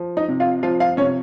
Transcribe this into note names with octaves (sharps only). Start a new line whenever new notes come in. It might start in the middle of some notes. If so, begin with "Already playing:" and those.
Already playing: F3
D#4 D#5
C3
F4 F5
F3 F4 F5
F4 F5
C3 C#4 C#5